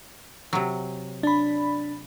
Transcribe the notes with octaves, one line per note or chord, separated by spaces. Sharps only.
C3 F#3
D4 B5